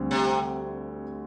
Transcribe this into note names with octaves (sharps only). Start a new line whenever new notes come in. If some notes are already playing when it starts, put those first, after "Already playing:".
Already playing: D2 D3 G3 C4
C3